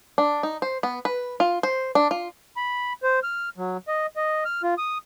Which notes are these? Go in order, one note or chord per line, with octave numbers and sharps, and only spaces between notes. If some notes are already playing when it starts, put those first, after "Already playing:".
D4
D#4
C5
B3
B4
F4
C5
D4
F4
B5
C5
F6
F#3
D#5
D#5
F6
F4
D#6